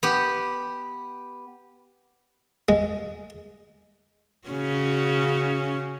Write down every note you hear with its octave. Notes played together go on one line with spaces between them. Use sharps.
B3 G4
G#3
C#3 C#4 F#4